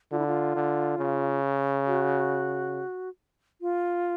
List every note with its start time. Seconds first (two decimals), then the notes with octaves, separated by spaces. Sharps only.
0.12 D3 F4
0.19 E4
0.27 F4
0.55 D3
0.99 C#3
1.86 F#4
3.61 F4